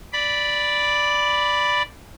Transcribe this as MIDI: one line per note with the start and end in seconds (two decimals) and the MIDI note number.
0.13 1.82 74
0.13 1.82 83